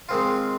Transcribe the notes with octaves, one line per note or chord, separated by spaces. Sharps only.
D#3 G#3 C4 F4